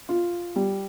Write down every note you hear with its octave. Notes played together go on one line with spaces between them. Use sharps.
F4
G3